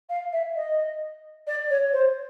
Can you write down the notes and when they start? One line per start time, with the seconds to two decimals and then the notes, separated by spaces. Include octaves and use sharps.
0.09 F5
0.32 E5
0.55 D#5
1.46 D5
1.69 C#5
1.92 C5